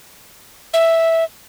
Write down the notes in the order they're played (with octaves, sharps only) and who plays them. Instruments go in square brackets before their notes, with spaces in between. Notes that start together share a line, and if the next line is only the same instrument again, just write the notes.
[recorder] E5